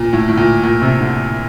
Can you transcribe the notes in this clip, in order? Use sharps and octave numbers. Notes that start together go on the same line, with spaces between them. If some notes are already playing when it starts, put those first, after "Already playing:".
Already playing: A#2
A2
A2
A#2
A#2
C3
D3